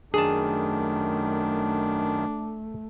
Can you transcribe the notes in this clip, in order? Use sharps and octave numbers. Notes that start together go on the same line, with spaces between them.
F#2 D#3 A3 D4 G#4 A5